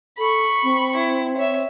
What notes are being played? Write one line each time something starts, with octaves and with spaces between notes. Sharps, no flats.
A4 B5 C#6
C4
E4
C#5 E5